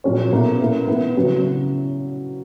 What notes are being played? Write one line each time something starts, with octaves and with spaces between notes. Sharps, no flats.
A#2 F#3 C#4 G#4 C#5
B2 A#3 C#4 E4 A#4
A#3 E4 B4
E3 B3 E4
C#3 F#3 C#4 E4